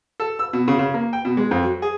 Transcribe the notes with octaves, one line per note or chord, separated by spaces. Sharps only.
A4
E6
B2
C#3
C#3
A#3
G5
B2
G#3
F2
F#3
G#4